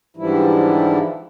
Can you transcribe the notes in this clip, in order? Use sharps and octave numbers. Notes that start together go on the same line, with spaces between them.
G#2 D3 E3 F3 G3 E4